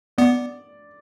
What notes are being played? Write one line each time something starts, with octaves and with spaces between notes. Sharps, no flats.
B3 D5